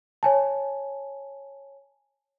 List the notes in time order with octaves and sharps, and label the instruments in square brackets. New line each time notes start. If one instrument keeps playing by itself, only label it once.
[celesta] C#5 G#5 A5